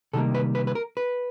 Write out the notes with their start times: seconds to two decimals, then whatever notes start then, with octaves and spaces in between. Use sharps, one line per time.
0.13 C3 D#3 G3 A#3 A4
0.34 B4
0.55 B4
0.67 B4
0.75 A#4
0.97 B4